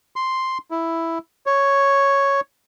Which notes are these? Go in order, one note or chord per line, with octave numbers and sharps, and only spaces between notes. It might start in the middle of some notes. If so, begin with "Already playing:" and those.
C6
E4
C#5